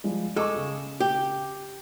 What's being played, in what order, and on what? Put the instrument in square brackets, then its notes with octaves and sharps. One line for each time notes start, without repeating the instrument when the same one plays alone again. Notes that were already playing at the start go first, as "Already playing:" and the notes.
[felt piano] F3 G3 G#3
[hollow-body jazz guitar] G#3 A4 [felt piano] C#6 D6 E6
[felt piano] C#3
[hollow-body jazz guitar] G4